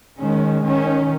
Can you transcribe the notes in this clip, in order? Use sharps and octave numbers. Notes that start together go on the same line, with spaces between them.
D#3 G#3 C#4
D#3 C#4